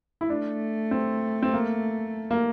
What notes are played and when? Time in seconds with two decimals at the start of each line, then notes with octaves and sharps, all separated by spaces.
0.21 E4
0.29 A3 D4
0.91 C4
1.43 C4
1.53 A#3
2.31 A#3